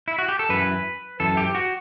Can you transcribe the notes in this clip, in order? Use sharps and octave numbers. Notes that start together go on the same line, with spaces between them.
E4
F#4
G4
A4
F#2 E3 B4
F#2 E3 A4
G4
F#4